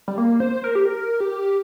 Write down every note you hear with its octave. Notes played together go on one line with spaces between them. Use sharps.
G3
A#3
C5
A#4
G4
A#4
G4